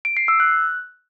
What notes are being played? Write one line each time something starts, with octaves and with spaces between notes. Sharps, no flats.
D7
C7
E6
F#6